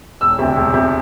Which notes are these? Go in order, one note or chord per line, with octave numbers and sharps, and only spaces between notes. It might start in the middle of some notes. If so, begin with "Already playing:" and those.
E1 E6
D2 C3
E1
C3